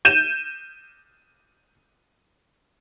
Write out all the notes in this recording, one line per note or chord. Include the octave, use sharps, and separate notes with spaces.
G6 D#7 E7